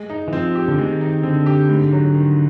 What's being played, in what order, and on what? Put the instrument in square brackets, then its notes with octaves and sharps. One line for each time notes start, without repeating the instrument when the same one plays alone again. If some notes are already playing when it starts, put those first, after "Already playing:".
Already playing: [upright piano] G#3
D#4
[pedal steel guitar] E3
[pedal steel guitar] F3 [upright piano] C4
[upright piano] G4
[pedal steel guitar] D3
[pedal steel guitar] D#3 [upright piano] G#3
[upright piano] D#4
[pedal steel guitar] D3 [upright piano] C4
[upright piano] G4
G#2
F#3
D#3